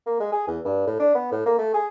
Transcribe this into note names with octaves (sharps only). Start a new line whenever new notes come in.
A#3
G#3
G#4
E2
G2
A2
D4
B3
A2
A#3
A3
G#4